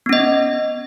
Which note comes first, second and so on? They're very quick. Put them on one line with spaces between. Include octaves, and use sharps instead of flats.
B3 C#4 D#5